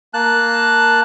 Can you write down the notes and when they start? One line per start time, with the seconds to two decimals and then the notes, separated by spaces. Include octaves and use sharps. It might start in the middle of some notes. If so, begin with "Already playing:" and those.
0.14 A#3 A5 F#6